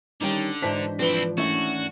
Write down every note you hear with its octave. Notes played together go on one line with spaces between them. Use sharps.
D3 D#3 G3 C#4 D#4 G5
G#2 E3 D4 F#4 C5 D#5 A#5 B6
F3 C4 E4 B4 D5
D#2 A3 C#4 E4 F#4 E5